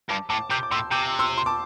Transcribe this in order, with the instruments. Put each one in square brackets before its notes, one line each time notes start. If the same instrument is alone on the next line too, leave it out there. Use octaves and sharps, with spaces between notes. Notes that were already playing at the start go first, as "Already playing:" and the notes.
[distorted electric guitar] G2 [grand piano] A5 D6
[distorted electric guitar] A2 [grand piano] A5 D6
[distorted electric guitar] C3 [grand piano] D6 G6
[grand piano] D6
[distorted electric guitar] A2 [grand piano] C6 E6
[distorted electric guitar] C3 [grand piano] D6 G6
[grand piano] C6 E6
C6
A5 D6